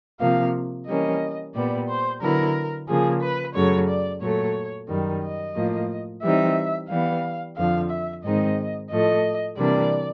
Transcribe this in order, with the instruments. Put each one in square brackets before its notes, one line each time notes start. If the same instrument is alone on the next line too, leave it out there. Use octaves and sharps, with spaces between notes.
[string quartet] C3 F3 A#3 [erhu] F5
[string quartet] E3 G3 A#3 C#4 [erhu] D#5
[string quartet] A#2 G3 B3 [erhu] D5
[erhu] C5
[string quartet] D3 F#3 B3 E4 [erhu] A#4
[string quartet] C#3 F3 A#3 [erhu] G#4
[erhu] B4
[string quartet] F#2 C#3 F#3 A3 [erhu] C#5
[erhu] D5
[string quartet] A#2 F#3 A3 [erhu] C#5
[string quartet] F#2 D#3 G3
[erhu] D#5
[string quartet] A2 F3 A#3
[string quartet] E3 G3 C4 D#4 [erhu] E5
[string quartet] E3 G3 B3 [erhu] F5
[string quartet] F2 D3 F3 [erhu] F5
[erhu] E5
[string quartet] G#2 D#3 G#3 C4 D#4 [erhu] D#5
[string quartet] A2 F3 A3 [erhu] D#5
[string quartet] C3 E3 G3 A#3 D4 [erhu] D5